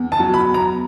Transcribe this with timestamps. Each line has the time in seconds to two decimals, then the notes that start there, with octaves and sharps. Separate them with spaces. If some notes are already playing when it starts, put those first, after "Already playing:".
Already playing: E2
0.12 A5
0.20 F#3
0.34 B5
0.47 E2
0.54 A#5